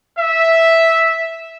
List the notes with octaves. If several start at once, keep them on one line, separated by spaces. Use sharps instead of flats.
E5